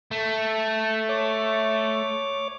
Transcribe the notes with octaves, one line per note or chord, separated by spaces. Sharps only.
A3
C#5 D6